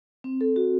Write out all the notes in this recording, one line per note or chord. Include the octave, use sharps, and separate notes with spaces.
C4
A4
F#4